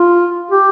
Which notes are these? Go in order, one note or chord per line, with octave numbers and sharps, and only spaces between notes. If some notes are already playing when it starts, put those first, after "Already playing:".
Already playing: F4
G4